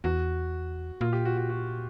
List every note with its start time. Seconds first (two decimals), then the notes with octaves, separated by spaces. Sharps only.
0.04 E2 F#4
1.01 A#2 F4
1.13 G4
1.25 F#4
1.37 F#4
1.50 F#4